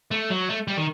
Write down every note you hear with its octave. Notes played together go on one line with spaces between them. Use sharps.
A3
F#3
A3
G3
D#3